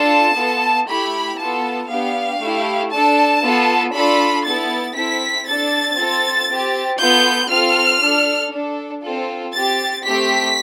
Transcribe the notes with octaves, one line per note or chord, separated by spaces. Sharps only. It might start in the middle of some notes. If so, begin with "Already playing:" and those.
Already playing: D4 F4 A4 A5
B3 F4 A4
A3 E4 G4 B5
B3 F4 A4 A5
B3 D4 G4 F5
A3 E4 G4
D4 A4 A5
B3 F4 A4
D4 F4 A4 B5
B3 E4 A4 A6
C4 E4 A4 B6
D4 A4 A6
C4 F4 A4
C4 G4
B3 F4 A4 G6
C4 F4 A4 F6
D4 A4
D4 A4
C4 F4 A4
C4 G4 A6
A3 C4 G4 B6